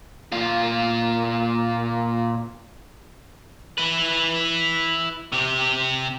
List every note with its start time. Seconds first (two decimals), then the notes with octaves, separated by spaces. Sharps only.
0.32 A#2 F4
3.78 E4 B4
5.32 C3 G4